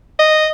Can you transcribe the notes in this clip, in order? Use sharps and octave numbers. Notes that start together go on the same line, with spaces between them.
D#5